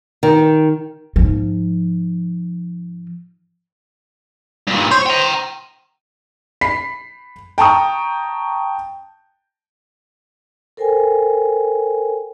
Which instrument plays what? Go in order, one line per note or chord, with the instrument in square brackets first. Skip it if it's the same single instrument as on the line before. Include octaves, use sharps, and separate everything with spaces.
[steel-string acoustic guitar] D#3
[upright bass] G#2 F3
[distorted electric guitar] G2 A#2
[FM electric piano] C5 [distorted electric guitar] C#5
[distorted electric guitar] G5 A#5
[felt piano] B5 B6 C7
G5 A5 A#5 C#6 D#6
[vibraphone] A4 A#4 C5 G5 G#5